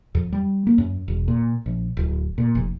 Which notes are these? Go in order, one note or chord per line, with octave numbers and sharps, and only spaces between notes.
F2
G3
A#3
F#2
E1
A#2
A#1
D1
A#2
F1